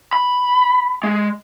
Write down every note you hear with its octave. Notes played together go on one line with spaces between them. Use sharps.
B5
G#3